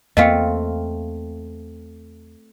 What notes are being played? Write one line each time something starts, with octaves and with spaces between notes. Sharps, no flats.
E2 A3 A#3 C4 F4 D#5 F5 G5